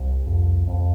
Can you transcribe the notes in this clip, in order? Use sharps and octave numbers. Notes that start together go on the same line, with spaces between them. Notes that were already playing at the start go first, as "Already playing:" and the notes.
Already playing: C2
F2
F2